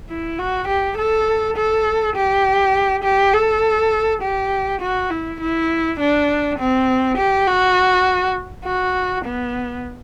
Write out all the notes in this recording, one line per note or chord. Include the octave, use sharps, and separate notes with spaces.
E4
F#4
G4
A4
A4
G4
G4
A4
G4
F#4
E4
E4
D4
C4
G4
F#4
F#4
B3